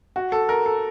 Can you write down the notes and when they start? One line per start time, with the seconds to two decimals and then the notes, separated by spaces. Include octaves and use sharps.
0.16 F#4
0.32 A4
0.49 A#4
0.66 A4